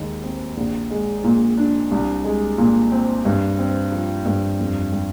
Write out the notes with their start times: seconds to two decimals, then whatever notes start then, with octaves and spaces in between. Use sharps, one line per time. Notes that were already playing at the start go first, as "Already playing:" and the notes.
Already playing: D#2 D#3 G#3
0.23 C4
0.57 A#1
0.90 G#3
1.24 A#2
1.57 D4
1.91 C2
2.24 G#3
2.58 A#2
2.92 C4
3.25 G2
3.59 C4
3.92 F3
4.26 G2
4.59 F2
4.92 G3